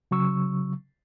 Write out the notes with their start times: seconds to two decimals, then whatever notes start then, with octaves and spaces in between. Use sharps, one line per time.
0.11 C#3 F#3 C#6 E6